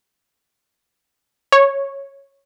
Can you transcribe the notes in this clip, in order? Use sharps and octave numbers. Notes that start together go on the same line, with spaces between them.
C#5